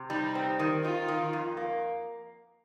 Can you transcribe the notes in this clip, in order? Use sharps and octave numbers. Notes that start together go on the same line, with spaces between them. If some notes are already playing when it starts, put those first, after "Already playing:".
Already playing: C3
G3 D#4
C4
D#3
D#4 F4
D#3
F2
A#3